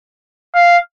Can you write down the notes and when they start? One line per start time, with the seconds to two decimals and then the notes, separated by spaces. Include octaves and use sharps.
0.55 F5